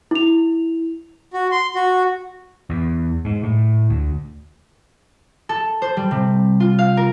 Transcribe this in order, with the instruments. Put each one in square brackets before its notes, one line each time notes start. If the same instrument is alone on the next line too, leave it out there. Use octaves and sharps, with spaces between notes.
[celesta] E4 F7
[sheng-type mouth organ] F#4
C6
F#4
[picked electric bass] E2
G#2
A2
D2
[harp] A4
C5
G3
C3
F4
F5
A#4